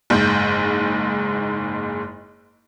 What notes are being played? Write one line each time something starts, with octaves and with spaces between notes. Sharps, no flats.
F#1 G#2 G6